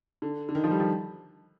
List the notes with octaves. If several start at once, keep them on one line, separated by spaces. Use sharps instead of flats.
D3
D3
D#3
F3
G3
F3